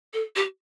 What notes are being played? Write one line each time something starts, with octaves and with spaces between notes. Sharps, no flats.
A4
G4